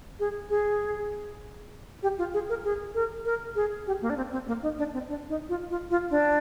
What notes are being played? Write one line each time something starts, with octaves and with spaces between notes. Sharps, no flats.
G#4
G#4
G4
F4
G#4
A#4
G#4
A#4
A#4
G#4
G4
A#3
D4
C4
C4
A#3
D#4
D4
C4
D4
D#4
F4
F4
F4
D4